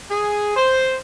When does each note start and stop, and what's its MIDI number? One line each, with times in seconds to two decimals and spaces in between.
0.10 0.52 68
0.57 0.97 72